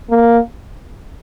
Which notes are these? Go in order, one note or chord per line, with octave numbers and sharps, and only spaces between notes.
A#3